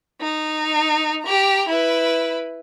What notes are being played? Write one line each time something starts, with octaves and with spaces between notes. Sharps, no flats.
D#4
G4 A#5
E4 B4